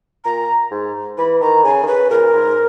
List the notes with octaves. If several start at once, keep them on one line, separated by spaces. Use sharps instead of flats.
A#2 A#5
G#2
E3 B5
D#3 A#5
C#3 G#5
D#3
C#3 B4
A#2 A#4
G#2